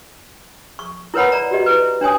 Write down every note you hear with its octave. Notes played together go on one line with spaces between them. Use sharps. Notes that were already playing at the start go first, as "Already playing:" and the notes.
C#6
E4 A#4 B4 C#5 F#5 B5
D5 A#5
F#4 G4 D#5
E4 B4
D4 C#5 G#5 D#6